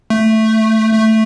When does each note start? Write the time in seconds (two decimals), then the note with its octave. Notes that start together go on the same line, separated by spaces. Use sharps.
0.10 A3
0.93 A3